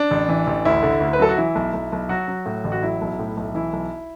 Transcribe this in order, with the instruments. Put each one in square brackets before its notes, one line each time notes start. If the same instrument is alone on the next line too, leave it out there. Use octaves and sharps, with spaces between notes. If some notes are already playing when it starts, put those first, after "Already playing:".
Already playing: [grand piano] D4
A1
E3
A1
D2 E4
D3
D2
B4
F#3 A4
F#4
E3 E4
B1
B1
B1
F#3 F#4
F#3
A2
A1
F#4
F#3 E4
B1
A2
B1
E3 E4
B1